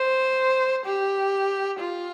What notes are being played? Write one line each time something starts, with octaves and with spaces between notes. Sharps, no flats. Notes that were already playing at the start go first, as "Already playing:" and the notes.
Already playing: C5
G4
F4